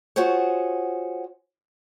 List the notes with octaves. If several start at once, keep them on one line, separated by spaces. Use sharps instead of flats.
F4 F#4 G#4 C5 C#5